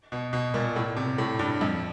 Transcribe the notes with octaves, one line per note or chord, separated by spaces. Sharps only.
B2
B2
A#2
A2
C3
A2
G2
F2